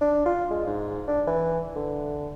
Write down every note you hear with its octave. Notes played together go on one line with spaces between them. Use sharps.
D4
F4
G#3
G#2
D4
E3
D3